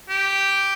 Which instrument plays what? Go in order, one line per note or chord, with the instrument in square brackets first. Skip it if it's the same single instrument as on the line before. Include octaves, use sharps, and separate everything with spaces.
[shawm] G4